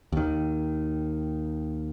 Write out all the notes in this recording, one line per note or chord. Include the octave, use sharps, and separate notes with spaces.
D#2 D#3